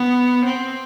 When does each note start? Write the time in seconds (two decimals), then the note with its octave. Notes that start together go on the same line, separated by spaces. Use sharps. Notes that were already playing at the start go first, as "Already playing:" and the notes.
Already playing: B3
0.46 C4